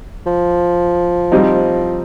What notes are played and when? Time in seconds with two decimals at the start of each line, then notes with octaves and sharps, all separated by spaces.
0.26 F3
1.32 G3 C4 D#4